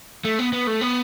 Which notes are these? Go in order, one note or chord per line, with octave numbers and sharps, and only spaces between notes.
A3
B3
B3
A3
B3